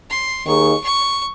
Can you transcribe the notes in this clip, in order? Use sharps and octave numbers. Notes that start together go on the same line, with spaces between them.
C6
D#2 D#3 A#3 D#4 G#4 C#6
C#6